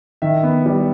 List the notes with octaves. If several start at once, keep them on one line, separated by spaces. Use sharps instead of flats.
D#3 E5
B3
G3